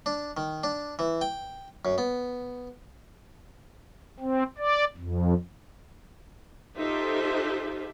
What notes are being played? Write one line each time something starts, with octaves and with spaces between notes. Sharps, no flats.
D4
D#3
D4
E3
G5
F#2
B3
C4
D5
F2
D#4 F4 G4 A4 C5 E5